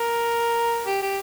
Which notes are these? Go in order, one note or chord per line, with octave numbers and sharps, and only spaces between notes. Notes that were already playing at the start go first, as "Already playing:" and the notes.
Already playing: A#4
G4
G4